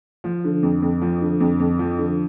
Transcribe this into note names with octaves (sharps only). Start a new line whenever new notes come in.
F3
D3
F2
F2
F3
D3
F2
F2
F3
D3